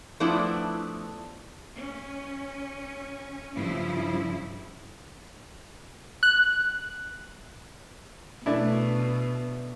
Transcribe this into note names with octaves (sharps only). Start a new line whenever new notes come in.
F3 A3 B3 D4 E4
C#4
G2 C#3 F3 E4
F#6
B2 A3 D4 E4